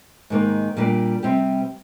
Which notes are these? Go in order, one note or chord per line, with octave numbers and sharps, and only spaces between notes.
G#2 D#3 A#3
A#2 G3 A#3 D4
C3 G3 C4 G4